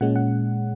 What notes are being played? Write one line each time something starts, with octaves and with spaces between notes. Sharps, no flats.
A#2 G#3 C#4 F#5
F#5